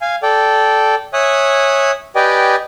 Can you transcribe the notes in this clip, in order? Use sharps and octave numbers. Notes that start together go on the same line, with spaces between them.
F5 G#5
A4 D5 G5
C#5 E5 G#5 D#6 F#6
G4 B4 D5 D#5 G5 G#5